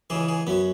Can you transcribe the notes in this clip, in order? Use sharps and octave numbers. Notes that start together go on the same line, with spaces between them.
C#2 C#3 E3 G#4
G#4
F#2 F#3 B3